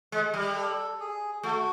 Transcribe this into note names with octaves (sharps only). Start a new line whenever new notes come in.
G#3
G3
A4
G#4
A3 F#4